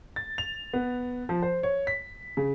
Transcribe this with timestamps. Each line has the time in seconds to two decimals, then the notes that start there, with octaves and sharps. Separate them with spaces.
0.16 A6
0.38 F7
0.74 B3
1.29 F3
1.42 C5
1.63 C#5
1.87 B6
2.37 C#3